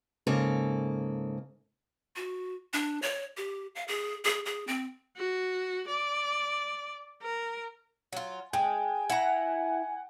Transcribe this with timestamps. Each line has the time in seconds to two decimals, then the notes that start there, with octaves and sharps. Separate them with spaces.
0.27 G#2 C#3 A#3 A4
2.16 F#4
2.73 D4
3.02 C#5
3.37 G4
3.75 F5
3.88 G#4
4.25 G#4
4.46 G#4
4.67 C4
5.17 F#4
5.87 D5
7.22 A#4
8.13 F#3 F4
8.53 G#3 G5 G#5
9.10 E4 F#5 A#5